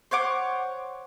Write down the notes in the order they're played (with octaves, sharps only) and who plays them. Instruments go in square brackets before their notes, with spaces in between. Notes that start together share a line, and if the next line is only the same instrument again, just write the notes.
[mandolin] C5 C#5 F#5 D6